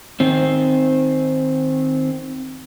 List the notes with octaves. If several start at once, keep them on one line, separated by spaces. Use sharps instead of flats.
D#3 C4